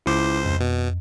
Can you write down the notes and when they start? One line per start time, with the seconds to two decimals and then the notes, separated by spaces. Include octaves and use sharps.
0.06 C#2 E4 C5 D6
0.45 F2
0.61 B2